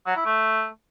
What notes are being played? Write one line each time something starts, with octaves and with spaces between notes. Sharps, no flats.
F#3
E4
A3